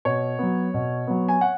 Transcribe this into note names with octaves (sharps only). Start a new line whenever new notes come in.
B2 C#5
F#3 B3
B2
F#3 B3
G#5
F#5